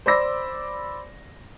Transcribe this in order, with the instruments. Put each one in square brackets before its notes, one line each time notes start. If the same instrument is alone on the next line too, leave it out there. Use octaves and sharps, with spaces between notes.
[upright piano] C5 D5 B5 D6 E6 A#6